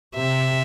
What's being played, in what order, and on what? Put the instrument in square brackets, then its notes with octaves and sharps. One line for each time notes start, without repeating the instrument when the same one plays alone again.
[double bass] C3 [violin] E5